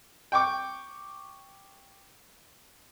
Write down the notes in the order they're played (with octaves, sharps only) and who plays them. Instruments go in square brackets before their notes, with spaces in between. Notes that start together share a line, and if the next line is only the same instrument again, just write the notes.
[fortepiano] G5 C#6 D6